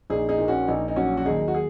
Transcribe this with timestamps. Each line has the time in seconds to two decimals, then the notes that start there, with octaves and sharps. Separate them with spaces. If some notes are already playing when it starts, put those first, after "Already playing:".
0.10 A#1 D#4 G#4
0.29 D#4 G#4
0.38 A#2
0.48 C#4 F#4
0.68 A#1 D#4
0.88 D#4
0.96 F#3 C#4 F#4
1.17 F#4
1.26 D#2 D#4 G#4
1.48 F#4
1.54 G#4